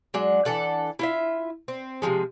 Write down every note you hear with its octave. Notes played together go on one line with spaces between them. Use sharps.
F#3 G#3 D4 F#5
E3 D4 A4 F#5
E4 F4 E5
C4
C3 D#3 F3 G#3